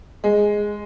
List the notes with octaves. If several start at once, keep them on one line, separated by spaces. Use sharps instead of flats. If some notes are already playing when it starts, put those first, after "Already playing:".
G#3